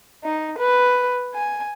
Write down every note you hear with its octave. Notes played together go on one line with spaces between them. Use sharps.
D#4
B4
G#5